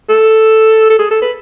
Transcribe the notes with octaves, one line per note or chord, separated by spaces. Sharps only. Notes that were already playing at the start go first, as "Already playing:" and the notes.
A4
A4
G#4
A4
B4